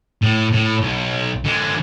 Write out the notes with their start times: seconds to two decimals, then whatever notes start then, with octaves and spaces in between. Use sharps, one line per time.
0.22 A2
0.53 A2
0.82 B1
1.45 D3 G#3